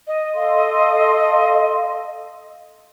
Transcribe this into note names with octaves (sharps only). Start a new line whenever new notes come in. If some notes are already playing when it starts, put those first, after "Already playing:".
D#5
A4 F5 C6